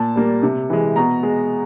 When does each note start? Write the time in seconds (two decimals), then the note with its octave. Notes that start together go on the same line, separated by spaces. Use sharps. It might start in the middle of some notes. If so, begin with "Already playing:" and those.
Already playing: A#2 A5
0.16 G3 A#3
0.43 C3
0.70 E3 G#3
0.96 B2 A#5
1.23 G#3